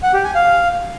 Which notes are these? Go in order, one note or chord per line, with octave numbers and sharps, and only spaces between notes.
F#5
G4
G#5
F5